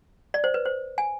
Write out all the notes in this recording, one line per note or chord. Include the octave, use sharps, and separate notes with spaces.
D5
C5
B4
C5
G#5